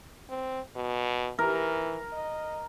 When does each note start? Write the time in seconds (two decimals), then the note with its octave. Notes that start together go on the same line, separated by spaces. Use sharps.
0.30 C4
0.76 B2
1.39 E3 A#4
2.13 D#5